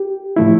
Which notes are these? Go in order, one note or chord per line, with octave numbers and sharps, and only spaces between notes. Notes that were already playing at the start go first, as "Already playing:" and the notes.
Already playing: G4
A2 F3 A3 E4